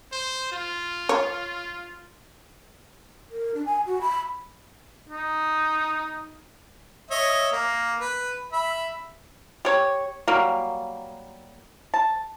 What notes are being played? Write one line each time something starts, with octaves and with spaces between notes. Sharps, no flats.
C5
F4
C#5
A#4
D4
G#5
F#4
B5
D#4
C#5 D#5 E5
A#3
B4
E5 B5
G4 C#5
F#3 G3 A#3
A5